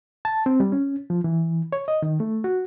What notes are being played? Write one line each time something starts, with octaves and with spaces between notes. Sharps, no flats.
A5
C4
G3
C#4
F3
E3
C#5
D#5
D#3
A3
F#4